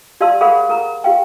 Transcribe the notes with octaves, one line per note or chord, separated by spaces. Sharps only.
G4 D5 F5 A5 C6 E6
G#4 A#4 C5 F5 F#5 B5
A#4 A#5
G4 F5 G5